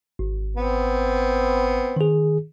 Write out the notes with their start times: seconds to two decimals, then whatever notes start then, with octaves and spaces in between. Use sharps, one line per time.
0.19 G#1
0.57 B3 C4
1.96 D#3 G#4